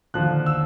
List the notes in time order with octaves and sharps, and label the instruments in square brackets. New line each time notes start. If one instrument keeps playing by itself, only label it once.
[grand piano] D#2 D3 F3 F#6
E6